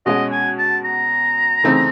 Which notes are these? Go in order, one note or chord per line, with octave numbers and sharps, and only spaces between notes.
B2 G#3 C#4 F#4 D#5
G#5
A5
A#5
C#3 E3 A3 C4 D#4